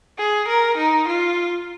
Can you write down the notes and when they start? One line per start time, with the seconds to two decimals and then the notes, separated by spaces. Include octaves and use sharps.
0.19 G#4
0.48 A#4
0.77 D#4
1.08 F4